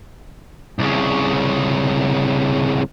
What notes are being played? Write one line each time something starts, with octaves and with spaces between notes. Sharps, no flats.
C2 C#3